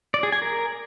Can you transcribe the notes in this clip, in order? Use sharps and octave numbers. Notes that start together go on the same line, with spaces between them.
D5
G#4
G#5
A#4